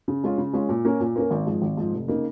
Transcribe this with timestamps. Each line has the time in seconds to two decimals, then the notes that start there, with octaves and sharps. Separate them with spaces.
0.08 C#3
0.24 G#3 C#4 F4
0.38 C#3
0.53 G#3 C#4 F4
0.69 A#2
0.85 A#3 C#4 A#4
1.00 A#2
1.16 A#3 C#4 A#4
1.31 G#1
1.47 G#2 F3
1.62 G#1
1.77 G#2 F3
1.92 F1
2.08 C#3 A#3 D#4